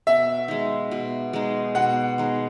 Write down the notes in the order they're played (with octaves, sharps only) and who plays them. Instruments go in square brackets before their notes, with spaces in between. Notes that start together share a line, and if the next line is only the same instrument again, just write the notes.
[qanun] B2 [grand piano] E5
[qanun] G#3 D#4
B2
G#3 D#4
[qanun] B2 [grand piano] F#5
[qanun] G#3 D#4 G#4